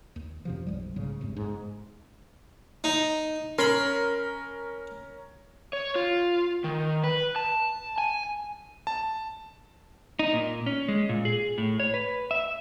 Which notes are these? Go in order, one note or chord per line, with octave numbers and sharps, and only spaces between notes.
D#2
F#2 C3 F3
B1 F3 G3
B1 G#2 C#3
G#1 E2 G2
G#2
D#4
C#4 A#4 B5 C6
C#5
F4
D#3
B4
A5
G#5
A5
D#4
A#2
C#4
G#3
A#2
G#4
A2
C#5
B4
E5